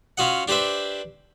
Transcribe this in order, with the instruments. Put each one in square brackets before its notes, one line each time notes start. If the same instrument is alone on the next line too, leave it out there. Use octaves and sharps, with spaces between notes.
[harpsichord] C#4 F4 F#4 D#5 F#5
D4 G4 B4 C5 E5